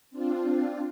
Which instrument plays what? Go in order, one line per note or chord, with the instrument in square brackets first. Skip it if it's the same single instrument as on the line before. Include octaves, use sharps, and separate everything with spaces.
[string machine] C4 D4 F4